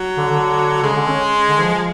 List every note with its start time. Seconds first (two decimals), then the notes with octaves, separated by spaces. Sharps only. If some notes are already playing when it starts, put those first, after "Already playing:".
Already playing: F#3
0.17 D3
0.31 D3
0.83 C#3 G#3
0.96 D3
1.09 C#4
1.48 D3
1.61 F3
1.74 F3